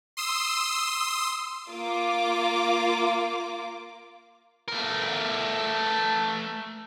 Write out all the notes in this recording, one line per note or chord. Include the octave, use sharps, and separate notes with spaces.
C6 D#6 E6
A#3 F4 D6
A3 A#4